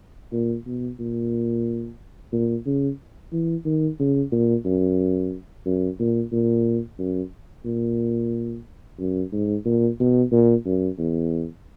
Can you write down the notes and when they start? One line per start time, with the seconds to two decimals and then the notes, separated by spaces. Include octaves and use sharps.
0.32 A#2
0.66 B2
0.99 A#2
2.32 A#2
2.66 C#3
3.32 E3
3.65 D#3
3.99 C#3
4.32 A#2
4.65 F#2
5.66 F#2
5.99 A#2
6.32 A#2
6.99 F#2
7.65 A#2
8.99 F#2
9.32 G#2
9.65 A#2
9.99 B2
10.32 A#2
10.66 F#2
10.99 E2